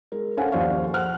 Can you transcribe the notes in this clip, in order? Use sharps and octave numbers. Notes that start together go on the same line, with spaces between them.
G#3 A#4
C#4 A4 C5 F5 F#5 G#5
D#2 F3 C5 D5 F5 C#6
C5 F#5 F6 F#6